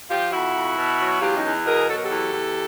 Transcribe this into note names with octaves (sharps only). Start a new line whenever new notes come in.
F3 F4 G4
F2 E4 F#4
F2
B2
F#3
E2 F4 G4
C#4 D#4
E2
B2 G#4 A#4
F#3 A4
A#4
G4 A4
E2
E2